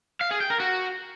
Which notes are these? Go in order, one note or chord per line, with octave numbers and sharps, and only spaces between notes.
F5
G#4
G5
A#4
F#4